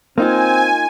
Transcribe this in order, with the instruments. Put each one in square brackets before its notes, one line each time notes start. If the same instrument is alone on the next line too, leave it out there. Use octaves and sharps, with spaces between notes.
[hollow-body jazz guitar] A#3 D#4 F4 [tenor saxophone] C4 [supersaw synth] G#5